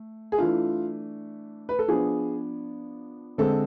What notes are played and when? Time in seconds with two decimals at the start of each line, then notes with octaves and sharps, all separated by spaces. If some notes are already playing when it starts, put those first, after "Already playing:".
Already playing: A3
0.32 G#4
0.38 E3 A3 D4 F4
1.69 B4
1.79 A4
1.88 F3 B3 D4 G#4
3.38 D3 G#3 C4 A4